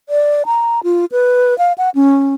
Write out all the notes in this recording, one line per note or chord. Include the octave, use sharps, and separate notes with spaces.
D5
A#5
F4
B4
F5
F#5
C#4